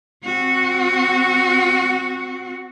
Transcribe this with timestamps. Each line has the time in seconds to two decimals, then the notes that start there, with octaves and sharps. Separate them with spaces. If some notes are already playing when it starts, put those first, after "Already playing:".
0.24 C4 F#4